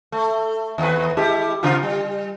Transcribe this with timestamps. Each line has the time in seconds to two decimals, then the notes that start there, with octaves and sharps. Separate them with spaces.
0.12 A3
0.78 D#2 B4
1.17 G#3 E4 G4
1.63 C#3 C4 F4
1.83 G3